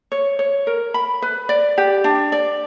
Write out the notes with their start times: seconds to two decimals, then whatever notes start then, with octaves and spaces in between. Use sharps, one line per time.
0.12 C#5
0.39 C#5
0.67 A#4
0.94 B5
1.22 B4
1.49 D5
1.78 G4
2.04 D4
2.32 D5